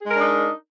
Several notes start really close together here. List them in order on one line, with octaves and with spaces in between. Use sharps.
G#4 G#3 A#4 D4 D#4